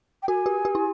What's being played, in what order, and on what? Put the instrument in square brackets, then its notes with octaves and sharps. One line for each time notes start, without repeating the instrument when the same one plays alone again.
[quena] G5
[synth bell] F#4 [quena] G#5
[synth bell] G4
G4
E4